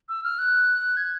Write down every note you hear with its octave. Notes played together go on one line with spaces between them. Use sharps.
E6
F6
F#6
G#6